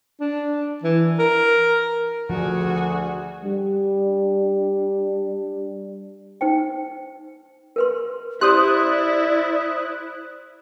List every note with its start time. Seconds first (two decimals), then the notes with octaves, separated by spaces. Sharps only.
0.20 D4
0.84 E3
1.19 A#4
2.30 D2 F3 F#4 G#4
3.44 G3 D4
6.41 D#4 C5 G5
7.76 A#4 B4 C6
8.41 E4 G4 C5 D5 C6 D#6 F#6